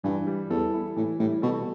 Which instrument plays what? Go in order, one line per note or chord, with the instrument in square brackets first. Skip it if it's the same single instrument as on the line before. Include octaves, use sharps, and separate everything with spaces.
[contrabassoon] G2 [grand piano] E3
[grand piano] G3
[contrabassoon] E2 [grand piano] A4
[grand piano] E4
[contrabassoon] A2 [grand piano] E3
[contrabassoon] A2 [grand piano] G3
[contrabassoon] B2 [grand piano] A4